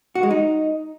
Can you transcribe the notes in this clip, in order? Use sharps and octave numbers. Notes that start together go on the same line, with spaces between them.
F#4
G#3
D#4